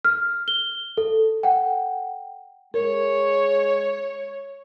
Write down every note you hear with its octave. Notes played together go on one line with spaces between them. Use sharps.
F6
G7
A4
F#5 G5
G#3 A#4 C#5